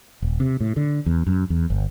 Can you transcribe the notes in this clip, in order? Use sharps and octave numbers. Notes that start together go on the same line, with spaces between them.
D#1
C3
A2
D3
E2
F#2
E2
G1